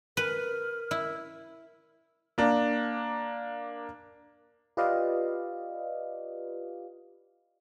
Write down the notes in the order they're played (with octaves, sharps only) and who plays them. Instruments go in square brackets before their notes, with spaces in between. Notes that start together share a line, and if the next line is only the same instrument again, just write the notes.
[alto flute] A#4 [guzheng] B4
[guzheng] E4
[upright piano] A#3 D4
[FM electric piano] F4 G4 B4 D5 D#5 F5